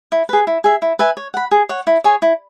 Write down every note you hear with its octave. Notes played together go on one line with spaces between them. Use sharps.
E4
G#4 B4
E4
G#4 E5
E4
B4 E5 G#5
C#5
F#5 B5
G#4
C#5 F#5
E4
G#4 C#5 G#5
E4